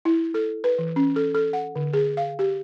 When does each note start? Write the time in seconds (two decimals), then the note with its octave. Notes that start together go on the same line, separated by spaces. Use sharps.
0.05 E4
0.34 A4
0.64 B4
0.78 E3
0.96 C#4
1.16 A4
1.34 A4
1.53 F#5
1.76 D3
1.93 G#4
2.17 F5
2.39 G4